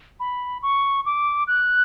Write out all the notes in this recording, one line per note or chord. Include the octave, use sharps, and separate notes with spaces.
B5
C#6
D6
F#6